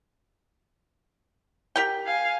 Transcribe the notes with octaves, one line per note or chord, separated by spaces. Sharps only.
G4 A#4 G5
F5 G#5